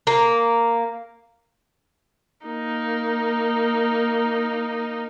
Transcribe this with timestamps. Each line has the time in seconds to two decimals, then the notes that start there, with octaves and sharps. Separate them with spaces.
0.07 A#3
2.46 A#3 D#4